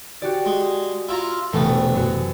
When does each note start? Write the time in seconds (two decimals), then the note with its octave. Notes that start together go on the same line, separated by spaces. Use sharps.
0.22 F#4 G4 D5
0.46 G#3
1.09 E4 F4 A#5
1.53 E1 C3 A3 B3
1.94 F#2 F#4